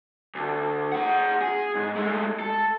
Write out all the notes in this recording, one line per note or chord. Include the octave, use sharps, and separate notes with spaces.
D2
G#4 F#5
G#4
G#2
G#3 A3
A4